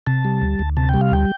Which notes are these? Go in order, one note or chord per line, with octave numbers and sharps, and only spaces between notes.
C3 A5
G3
D2
D2
C3 A5
G3 G5
F5
D2 G5